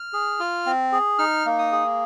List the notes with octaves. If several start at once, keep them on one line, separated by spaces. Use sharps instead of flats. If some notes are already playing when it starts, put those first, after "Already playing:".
Already playing: F6
G#4
F4
C4
G#4
D#4 F6
A#3
D#6
G#4